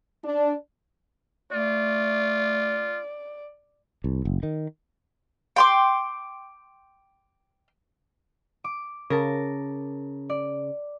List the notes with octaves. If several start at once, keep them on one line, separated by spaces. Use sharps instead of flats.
D4
A3 F4 D5
C2
F#1
D#3
G5 C6 D6
D6
C#3 A#4 A5
D5